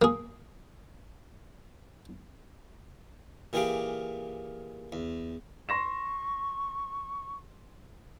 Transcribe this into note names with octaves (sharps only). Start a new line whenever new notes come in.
A#3 G#4
A#2 E3 G4 G#4 F5 D6
E2
C6 C#6 A#6 E7